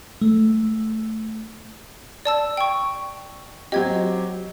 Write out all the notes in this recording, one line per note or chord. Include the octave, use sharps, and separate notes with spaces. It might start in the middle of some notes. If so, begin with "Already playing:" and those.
A3
D5 A5 E6
G5 C#6
F#3 C4 G4 D#5 G#6